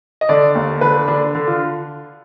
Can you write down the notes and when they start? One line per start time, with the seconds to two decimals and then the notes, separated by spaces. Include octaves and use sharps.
0.21 D#5
0.29 D3 D5
0.55 D#2
0.81 D3 B4
1.08 D3 D4
1.35 D3
1.48 F4